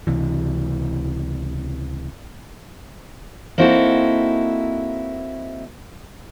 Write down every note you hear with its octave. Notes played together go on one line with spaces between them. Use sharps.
C#2 C3 E3
A#3 C4 D#4 E4 F#4 A4